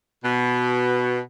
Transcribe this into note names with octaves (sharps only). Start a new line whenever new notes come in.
B2